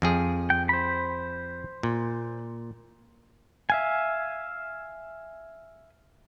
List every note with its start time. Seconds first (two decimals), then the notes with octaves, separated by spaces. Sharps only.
0.02 F2 F3 G#4
0.50 G5
0.69 C5 B5
1.83 A#2
3.70 E5 F5 G#5